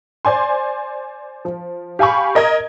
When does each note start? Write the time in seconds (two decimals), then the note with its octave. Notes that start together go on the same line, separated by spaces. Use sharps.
0.25 C5 D5 G#5 C6
1.45 F3
1.99 G4 F5 G#5 B5 C#6
2.35 A#4 D#5 A#5 G#6